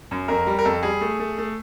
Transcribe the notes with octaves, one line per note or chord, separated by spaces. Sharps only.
F#2
F2 A#4
G3
A#4
F2 A4
G3 G#4
A3
A3
A3